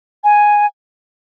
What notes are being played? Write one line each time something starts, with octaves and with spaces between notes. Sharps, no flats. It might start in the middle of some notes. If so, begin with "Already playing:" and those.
G#5